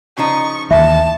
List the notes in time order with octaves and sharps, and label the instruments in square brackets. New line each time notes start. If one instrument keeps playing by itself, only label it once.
[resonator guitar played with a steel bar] C#3 F3 D#4 [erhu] C#6
[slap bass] D#2 E3 [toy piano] E5 [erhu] A5